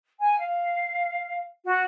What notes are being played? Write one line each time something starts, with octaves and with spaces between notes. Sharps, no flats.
G#5
F5
F#4